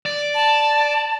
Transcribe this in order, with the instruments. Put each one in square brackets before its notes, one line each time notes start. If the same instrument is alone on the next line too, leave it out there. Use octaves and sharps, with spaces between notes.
[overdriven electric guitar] D5
[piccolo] A5